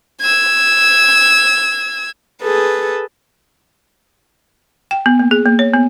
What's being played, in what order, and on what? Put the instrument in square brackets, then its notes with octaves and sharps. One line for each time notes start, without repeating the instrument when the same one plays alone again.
[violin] E6 G#6
[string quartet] G#4 A4 B4
[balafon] G5
B3
A#3
G#4
A#3
C#5
B3